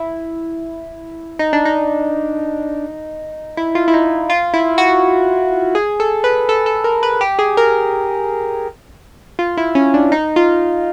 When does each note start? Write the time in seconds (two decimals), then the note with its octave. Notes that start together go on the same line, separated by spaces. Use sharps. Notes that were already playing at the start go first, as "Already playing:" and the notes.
Already playing: E4
1.39 D#4
1.53 D4
1.65 D#4
3.57 E4
3.75 F4
3.88 E4
3.94 D#4
4.30 F4
4.54 E4
4.78 F#4
5.75 G#4
6.00 A4
6.24 B4
6.49 A4
6.66 A4
6.84 A#4
7.03 B4
7.21 G4
7.39 G#4
7.57 A#4
9.39 F4
9.57 E4
9.75 C#4
9.94 D4
10.12 D#4
10.36 F4